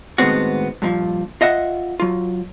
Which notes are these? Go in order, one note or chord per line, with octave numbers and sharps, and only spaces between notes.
A2 D#3 G#3 B3 C4 F#4
G2 A#2 E3 F3
F4 D#5 E5 F#5
F#3 F4